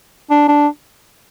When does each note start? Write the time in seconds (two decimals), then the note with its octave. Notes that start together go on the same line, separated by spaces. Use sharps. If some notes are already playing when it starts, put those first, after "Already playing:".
0.30 D4
0.48 D4